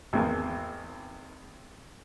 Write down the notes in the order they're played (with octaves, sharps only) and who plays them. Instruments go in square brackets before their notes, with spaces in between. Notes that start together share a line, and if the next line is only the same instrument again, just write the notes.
[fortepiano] G#1 E2 A#3